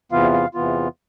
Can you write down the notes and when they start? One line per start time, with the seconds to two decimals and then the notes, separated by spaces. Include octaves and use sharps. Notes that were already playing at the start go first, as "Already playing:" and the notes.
0.12 E2 C3 E3 B3 F4 F5
0.33 F5
0.55 E2 C3 E3 B3 F4